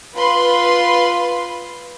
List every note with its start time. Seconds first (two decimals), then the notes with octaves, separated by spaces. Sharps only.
0.17 F4 B4 B5 C6